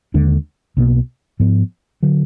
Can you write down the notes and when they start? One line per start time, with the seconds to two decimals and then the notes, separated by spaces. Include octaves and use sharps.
0.14 D#2 D3 G#3 D4
0.77 B1 B2 A#3
1.40 G#2 F3 B3
2.03 D3 F#3